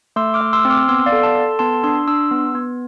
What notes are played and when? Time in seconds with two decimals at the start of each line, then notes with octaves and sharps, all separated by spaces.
0.16 A3 C6 E6
0.34 D6 F6
0.41 A3
0.53 C6 E6
0.65 C4
0.70 D6 F6
0.89 B3 C6 E6
1.06 D5 F5
1.12 A4
1.23 A5 C6
1.35 A4
1.59 B3 A5 C6
1.84 D4 C6 E6
2.07 D4 C6 E6
2.31 B3
2.55 B3